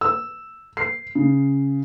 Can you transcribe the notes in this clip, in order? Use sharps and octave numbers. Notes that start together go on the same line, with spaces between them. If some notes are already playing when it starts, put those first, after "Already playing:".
E6
C7
C#3